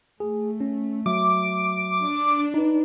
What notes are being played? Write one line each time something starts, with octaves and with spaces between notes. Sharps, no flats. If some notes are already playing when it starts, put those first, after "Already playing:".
A3 G#4
C#4
F#3 E5 D6
D4
D#4 B4